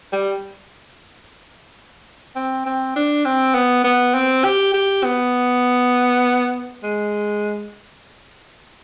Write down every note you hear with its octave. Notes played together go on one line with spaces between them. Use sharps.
G3
C4
C4
D4
C4
B3
B3
C4
G4
G4
B3
G#3